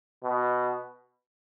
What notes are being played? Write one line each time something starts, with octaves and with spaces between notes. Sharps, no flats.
B2